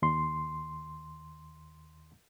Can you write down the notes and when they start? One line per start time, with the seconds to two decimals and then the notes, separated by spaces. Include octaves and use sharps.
0.02 D#2 C6